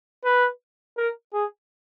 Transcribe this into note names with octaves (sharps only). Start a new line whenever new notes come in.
B4
A#4
G#4